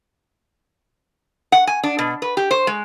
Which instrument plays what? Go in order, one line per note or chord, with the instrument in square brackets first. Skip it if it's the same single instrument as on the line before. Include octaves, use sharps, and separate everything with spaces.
[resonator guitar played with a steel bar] F#5
G#5
D4
B2
B4
G4
C5
G#3